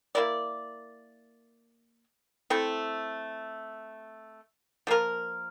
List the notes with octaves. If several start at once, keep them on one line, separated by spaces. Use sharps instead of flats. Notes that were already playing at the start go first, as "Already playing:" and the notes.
A#3 E4 A#4 D5
A3 C4 E4 A4
F3 A#3 F4 A#4